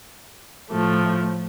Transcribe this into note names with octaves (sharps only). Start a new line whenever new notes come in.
A2 F3 A3